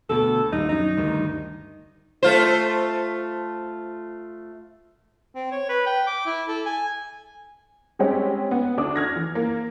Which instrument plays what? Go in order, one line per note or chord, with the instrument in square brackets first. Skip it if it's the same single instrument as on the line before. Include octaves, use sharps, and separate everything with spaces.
[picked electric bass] D2 B2 [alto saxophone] A4
[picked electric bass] D#1 A#1 G2 [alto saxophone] D#4
[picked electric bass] F#2 [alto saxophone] D#4
[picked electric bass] D2 G2 D#3
[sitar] A3 F4 C5
[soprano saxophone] C4
C#5
B4
G5
D6
E4
A4
G#5
[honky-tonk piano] G3 G#3 C4 C#4 G4
B3
D2 D4 D6 D#6
F6 G#6 A#6
E3
A#3